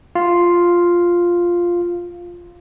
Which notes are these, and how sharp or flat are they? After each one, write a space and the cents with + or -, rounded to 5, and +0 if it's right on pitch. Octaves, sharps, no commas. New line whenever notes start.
F4 +0 F5 +0